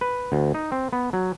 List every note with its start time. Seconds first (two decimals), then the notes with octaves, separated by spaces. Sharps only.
0.01 B4
0.32 D2
0.54 D#4
0.72 C4
0.93 B3
1.13 F#3